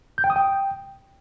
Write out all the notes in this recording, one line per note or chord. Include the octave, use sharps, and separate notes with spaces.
G6
G5
D#6
G5